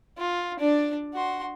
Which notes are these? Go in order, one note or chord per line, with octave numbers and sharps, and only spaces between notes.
F4
D4 D5
F#4 C6